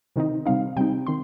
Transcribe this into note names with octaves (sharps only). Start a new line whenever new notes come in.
C3 D#3 C4 D#4
C3 G3 C4 D#4 F5
C3 G3 C4 D#4 G5
D#3 C4 C6